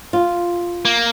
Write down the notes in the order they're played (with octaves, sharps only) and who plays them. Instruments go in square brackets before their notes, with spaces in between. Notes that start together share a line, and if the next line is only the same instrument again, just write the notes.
[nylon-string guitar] F4
[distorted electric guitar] A#3